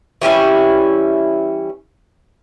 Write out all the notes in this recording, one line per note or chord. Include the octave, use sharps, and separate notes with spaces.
E3 G3 C#4 E4